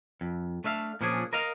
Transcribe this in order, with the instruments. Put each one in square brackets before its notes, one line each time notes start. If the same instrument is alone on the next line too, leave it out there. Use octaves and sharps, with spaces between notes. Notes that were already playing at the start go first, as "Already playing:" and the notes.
[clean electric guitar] F2
A3 D4 E5 F5
A#2 F3 C#4 D4 G#4
A#4 D#5 F5